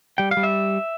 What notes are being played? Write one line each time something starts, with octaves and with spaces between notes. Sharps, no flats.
G3 G5
F5
G3
E5